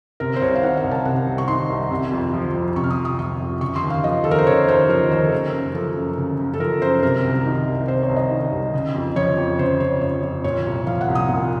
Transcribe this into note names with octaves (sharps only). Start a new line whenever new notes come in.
C3 A#4
C5
C2 C#5
F5
D#3 F#5
F5
C2
A5
C3 F#5
C2
C#6
D#3 C6
C2
C3
F2
F3
F2
C3 C#6
F6
D#6
F2
D#6
F3 C#6
F2
C#3 C#6
C6
D#2
F5
F3 D#5
D#2 A4
A#4
C5
C#3 C#5
D#2 C5
F3 A#4
D#2 C5
A4
C#3 A#4
F#2
F3 A4
F#2
C#3
F#2
A4
F3 A#4
F#2 C5
C3 A#4
C2
D#3
C2
C3 C5
C#5
C2
D#5
D#3
C2
C#3
F2
F3 C#5
F2
C#3 C5
F2 C#5
F3 C#5
F2
A#2 C#5
C2
F3 F5
F#5
C2
D#6
A#2